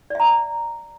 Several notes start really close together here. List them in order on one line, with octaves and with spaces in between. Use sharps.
D5 E5 A#5